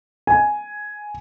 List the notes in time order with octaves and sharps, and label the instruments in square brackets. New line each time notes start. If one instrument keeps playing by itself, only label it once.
[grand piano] G#5